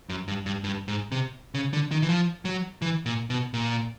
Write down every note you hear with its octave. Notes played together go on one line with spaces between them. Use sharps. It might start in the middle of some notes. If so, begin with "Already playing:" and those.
F#2
G2
G2
G2
G#2
C3
C#3
D3
D#3
E3
F3
F#3
E3
A#2
B2
A#2